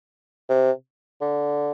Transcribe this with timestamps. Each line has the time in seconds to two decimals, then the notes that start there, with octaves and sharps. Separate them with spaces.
0.49 C3
1.22 D3